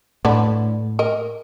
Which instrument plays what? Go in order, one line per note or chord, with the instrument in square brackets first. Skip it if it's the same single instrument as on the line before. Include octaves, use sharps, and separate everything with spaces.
[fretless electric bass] A2 [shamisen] D3 D4 B4
[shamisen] A#4 D#5